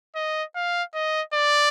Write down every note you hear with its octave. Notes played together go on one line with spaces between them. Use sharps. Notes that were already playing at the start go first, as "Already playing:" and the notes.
D#5
F5
D#5
D5